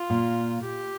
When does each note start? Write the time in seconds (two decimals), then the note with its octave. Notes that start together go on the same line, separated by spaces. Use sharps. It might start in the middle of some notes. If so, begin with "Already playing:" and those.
Already playing: F4
0.10 A#2
0.63 G4